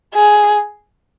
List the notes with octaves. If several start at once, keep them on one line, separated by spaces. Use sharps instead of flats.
G#4